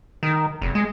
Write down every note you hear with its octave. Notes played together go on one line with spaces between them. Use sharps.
D#3
F1
G#3